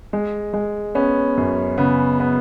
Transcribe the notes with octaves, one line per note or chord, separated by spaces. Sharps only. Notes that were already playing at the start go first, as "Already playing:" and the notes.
G#3
G#3
B3 C#4
F#2
C#3 B3
B3